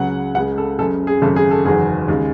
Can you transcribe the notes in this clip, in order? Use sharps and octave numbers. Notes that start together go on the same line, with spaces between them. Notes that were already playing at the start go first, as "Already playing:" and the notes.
Already playing: C#2 C#3 F#3 F#5
C#2 C#3 G#3 F#5
A4
F#1 F#2 C#3 A4
G#4
G#1 F#2 C#3 A4
G#4
A4
F#1 E2 D#3 F#3 G#4
D#2 C#3 G#3